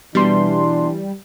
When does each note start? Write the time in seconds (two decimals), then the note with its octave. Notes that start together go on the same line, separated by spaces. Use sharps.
0.15 B2 E3 G3 D4 C6